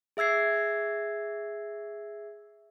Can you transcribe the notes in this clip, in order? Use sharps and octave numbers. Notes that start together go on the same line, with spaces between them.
G#4 E5 E6 G#6 C7